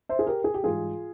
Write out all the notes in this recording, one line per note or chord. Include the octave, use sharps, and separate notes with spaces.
C5 E5
G#4
G4 A#4
G#4
G4
G#2 E3 G3 F4 G#4